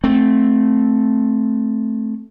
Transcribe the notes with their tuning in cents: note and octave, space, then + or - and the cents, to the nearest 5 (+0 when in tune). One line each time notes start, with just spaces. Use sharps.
A3 -10 C4 +0